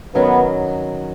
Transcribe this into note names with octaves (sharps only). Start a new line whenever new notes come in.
D#3 F#3 B3 C#4